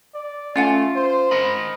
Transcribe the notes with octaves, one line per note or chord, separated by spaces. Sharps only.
D5
A3 C#4 F4 F#5 G#5
C5
A#4 D#5 B5